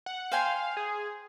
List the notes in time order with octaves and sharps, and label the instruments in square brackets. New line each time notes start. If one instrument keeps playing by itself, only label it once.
[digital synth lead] F#5
[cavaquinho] C5 G5 G#5 [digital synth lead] F5
[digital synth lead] G#4